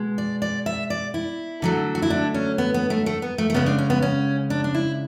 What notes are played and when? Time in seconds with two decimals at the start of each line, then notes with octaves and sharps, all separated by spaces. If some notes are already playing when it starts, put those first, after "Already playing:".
Already playing: B2 G#3
0.18 D5
0.42 D5
0.66 E5
0.90 D5
1.14 E4
1.62 D3 F#3 A3
1.95 F#4
2.02 E4
2.10 D4
2.34 C#4
2.58 B3
2.74 B3
2.90 A3
3.06 A3
3.22 B3
3.38 A3
3.50 A3
3.54 C#3 G#3 B3
3.66 D4
3.78 C#4
3.90 B3
4.02 C#4
4.50 D4
4.64 D4
4.74 E4